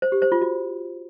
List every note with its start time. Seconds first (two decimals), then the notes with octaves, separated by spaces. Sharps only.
0.02 C5
0.12 G4
0.22 C5
0.32 F4
0.42 F#4